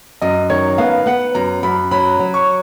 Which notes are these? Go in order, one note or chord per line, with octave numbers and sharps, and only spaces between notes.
F#2 D#5
D#3 C#5
B3 F5
B3 F#5
F#2 A#5
F#2 B5
F#3 B5
F#3
C#6